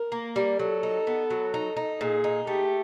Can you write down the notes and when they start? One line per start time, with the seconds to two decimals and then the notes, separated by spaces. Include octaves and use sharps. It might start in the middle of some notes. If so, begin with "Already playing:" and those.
Already playing: A#4
0.12 A#3
0.36 G3
0.59 F#3 A4
0.83 D#4
1.07 B3
1.30 F#3
1.54 D#4
1.77 D#4
2.00 A#2 G#4
2.24 D#4
2.47 A3 G4